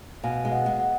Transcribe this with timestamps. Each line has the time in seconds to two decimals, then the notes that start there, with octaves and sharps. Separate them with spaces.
0.23 B2 F5 G#5
0.45 G#3
0.52 D#5 F#5
0.66 G#3
0.80 D#5 F#5